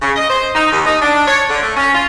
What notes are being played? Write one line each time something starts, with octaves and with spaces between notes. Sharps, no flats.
C#3
D#5
C5
D#4
D#2
D#4
D4
C#5
D3
A3
C#4
F4